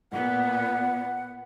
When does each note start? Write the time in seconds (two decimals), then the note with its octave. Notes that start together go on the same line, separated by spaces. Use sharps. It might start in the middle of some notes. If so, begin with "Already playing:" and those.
0.12 A#2 B3 F#5